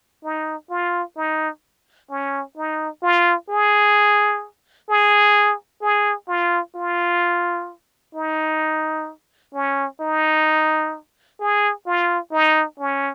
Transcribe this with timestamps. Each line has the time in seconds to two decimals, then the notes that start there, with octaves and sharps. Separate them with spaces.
0.24 D#4
0.70 F4
1.17 D#4
2.10 C#4
2.57 D#4
3.02 F4
3.49 G#4
4.89 G#4
5.82 G#4
6.28 F4
6.75 F4
8.14 D#4
9.54 C#4
10.00 D#4
11.40 G#4
11.86 F4
12.32 D#4
12.80 C#4